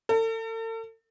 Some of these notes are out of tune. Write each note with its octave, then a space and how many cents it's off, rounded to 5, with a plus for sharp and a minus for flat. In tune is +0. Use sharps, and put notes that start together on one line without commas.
A4 +40